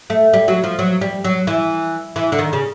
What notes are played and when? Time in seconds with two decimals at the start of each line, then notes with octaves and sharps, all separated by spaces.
0.10 A3
0.33 G3
0.48 F#3
0.64 F3
0.79 F#3
1.01 G3
1.24 F#3
1.47 E3
2.16 E3
2.32 D3
2.38 D#3
2.53 C#3